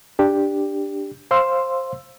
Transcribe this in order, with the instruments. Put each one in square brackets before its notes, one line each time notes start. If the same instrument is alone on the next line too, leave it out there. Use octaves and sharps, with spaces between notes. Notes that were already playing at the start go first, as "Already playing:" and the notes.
[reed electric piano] D4 G4
C5 F5 C6 E6